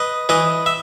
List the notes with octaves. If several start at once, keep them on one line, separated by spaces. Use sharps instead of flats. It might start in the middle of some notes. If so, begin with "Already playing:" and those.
Already playing: B4 D#5
E3 B4 D#5
E5